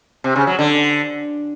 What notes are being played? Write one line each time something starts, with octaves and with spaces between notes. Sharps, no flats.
C3
C#3
F#3
D3